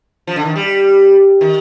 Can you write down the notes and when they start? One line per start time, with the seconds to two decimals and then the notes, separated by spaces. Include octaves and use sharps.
0.27 F3
0.36 D3
0.45 D#3
0.56 G3
1.41 D#3